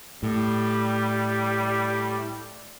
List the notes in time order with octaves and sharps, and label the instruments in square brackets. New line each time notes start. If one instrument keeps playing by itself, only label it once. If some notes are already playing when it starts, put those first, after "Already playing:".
[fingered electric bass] A2 [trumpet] G3